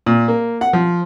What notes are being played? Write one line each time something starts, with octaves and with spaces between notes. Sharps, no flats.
A#2
A#3
F#5
F3